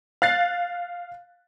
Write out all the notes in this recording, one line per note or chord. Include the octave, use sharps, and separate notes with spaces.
F5 F#6 A6 C7